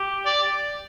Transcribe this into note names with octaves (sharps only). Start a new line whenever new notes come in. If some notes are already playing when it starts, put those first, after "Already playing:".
Already playing: G4
D5